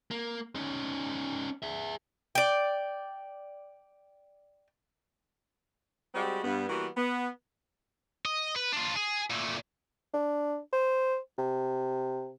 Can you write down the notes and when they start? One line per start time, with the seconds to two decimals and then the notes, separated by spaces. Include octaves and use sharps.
0.11 A#3
0.55 C#4 D#4
1.63 G#4 E5
2.35 D5 G5
6.14 G3 G#3 C4 F#4 G4
6.44 G2 B3
6.70 E3 G3 A#3 B3 F#4
6.97 B3
8.25 D#5
8.56 B4
8.72 D4 F4
8.96 G#4
9.30 A#2 A3
10.14 D4
10.73 C5
11.39 C3